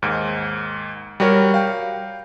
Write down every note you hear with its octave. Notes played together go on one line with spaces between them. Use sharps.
D#2 G#2
G3 F#4 A#4 C#5
F5 G5